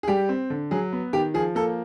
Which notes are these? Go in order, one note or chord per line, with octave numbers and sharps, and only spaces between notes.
G#4
G3 G4
C4
D3
F#3 G#4
B3
D#3 G4
F3 G#4
A#3 A4